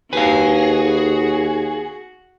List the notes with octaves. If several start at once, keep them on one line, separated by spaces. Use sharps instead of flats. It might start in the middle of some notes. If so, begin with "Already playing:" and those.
D#2 F#4 G#4 B4 F5